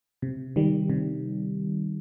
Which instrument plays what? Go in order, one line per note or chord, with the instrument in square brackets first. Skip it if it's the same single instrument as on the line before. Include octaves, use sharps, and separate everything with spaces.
[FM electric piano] C3
D#3 G3
C3